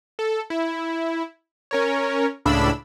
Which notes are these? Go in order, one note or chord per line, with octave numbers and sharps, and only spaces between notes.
A4
E4
C#4 A#4 C#5
C#2 A2 C#3 D4 B5 E6